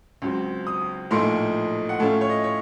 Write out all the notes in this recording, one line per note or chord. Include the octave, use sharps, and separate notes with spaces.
C#2 C#3 F#3 C4
D#6
A#1 A2 F3 A#3 D#4 C6
F#5
A2 A3 C#4 F4 A5
C#5
D#5
C#5